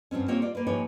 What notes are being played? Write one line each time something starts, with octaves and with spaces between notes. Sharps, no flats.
G2 F#3 C4 C#4
A#3 C4 F4 G4 C#5
F4 D5
A#3 B4
G#2 F3 A#3 G4 B4 C#5